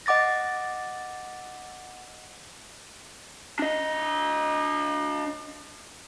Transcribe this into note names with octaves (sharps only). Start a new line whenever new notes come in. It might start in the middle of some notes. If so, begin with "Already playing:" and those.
D#5 F#5 D6 A6 A#6
D4 D#5